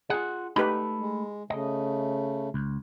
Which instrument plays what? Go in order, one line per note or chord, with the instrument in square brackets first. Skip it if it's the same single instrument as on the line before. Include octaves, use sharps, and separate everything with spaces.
[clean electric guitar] F4 F#5 [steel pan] G#4
[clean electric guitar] A3 A4 B5 [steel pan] D#4 G4 B4
[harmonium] G#3
[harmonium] C#3 A3 [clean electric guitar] D#5
[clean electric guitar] C#2